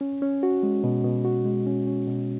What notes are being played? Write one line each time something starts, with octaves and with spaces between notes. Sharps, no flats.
C#4
C#4
F#4
G#3
B2
B2
F#4
G#3
C#4
C#4
B2